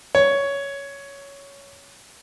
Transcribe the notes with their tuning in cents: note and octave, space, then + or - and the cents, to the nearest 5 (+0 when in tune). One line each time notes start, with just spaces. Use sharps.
C#5 +10